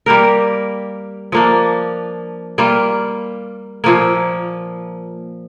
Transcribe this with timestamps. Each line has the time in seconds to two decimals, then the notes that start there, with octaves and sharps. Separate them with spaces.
0.06 G3 A#3 G4 A#4
1.32 F3 A#3 D4
2.58 G3 A#3 F4
3.84 A#2 F3 A#3